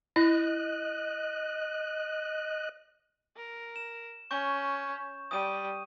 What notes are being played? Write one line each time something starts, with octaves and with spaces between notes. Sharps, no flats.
E4 D#5 F#6
A#4
E7
C#4 C#6 G6
G3 D#6 D#7